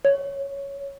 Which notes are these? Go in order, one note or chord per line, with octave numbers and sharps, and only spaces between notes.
C#5